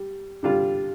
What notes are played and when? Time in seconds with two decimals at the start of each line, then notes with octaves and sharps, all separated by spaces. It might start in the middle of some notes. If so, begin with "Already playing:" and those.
Already playing: G3
0.43 D3 G3 D4 F4